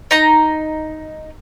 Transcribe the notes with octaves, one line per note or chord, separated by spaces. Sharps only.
D#4 A#5